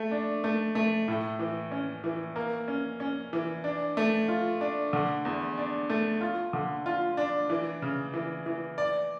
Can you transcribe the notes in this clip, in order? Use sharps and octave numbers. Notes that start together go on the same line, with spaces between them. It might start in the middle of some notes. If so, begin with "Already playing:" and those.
Already playing: A3
D4
A3
A3
A2
E3
C#4
E3
A#3
C#4
C#4
E3
D4
A3
F4
D4
D3
E2
D4
A3
F4
D3
F4
D4
E3
C#3
E3
E3
D5